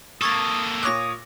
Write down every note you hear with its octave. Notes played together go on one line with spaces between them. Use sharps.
A#3 A4 C#6 D#6 G#6 A6
A#2 C#5 D6 D#6 F#6 A#6